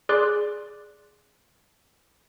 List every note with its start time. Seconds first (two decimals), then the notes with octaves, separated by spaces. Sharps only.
0.09 G#4 D5 C6 D6 F#6